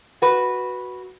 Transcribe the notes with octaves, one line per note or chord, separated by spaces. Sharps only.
F#4 B4